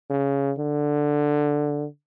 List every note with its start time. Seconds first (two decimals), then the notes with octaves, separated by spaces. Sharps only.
0.10 C#3
0.58 D3